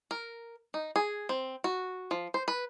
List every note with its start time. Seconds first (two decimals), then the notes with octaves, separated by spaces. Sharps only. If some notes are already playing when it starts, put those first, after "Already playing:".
0.11 A#4
0.74 D#4
0.96 G#4
1.29 C4
1.64 F#4
2.11 F3
2.34 C5
2.48 B4